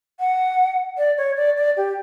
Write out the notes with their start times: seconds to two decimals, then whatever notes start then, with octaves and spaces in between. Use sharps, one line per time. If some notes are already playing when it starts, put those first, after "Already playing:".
0.20 F#5
0.98 D5
1.18 C#5
1.36 D5
1.57 D5
1.77 G4